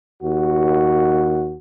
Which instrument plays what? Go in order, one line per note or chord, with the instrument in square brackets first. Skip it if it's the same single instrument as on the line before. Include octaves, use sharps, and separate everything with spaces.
[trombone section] D#2 F#4